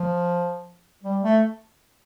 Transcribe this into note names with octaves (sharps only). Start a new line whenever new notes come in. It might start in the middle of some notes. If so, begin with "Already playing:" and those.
Already playing: F3
G3
A3